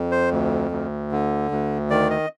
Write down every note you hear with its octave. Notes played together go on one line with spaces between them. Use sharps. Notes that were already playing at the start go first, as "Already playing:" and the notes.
Already playing: F2
C5
D2
D2
D3
D2
D#3 D5
D#5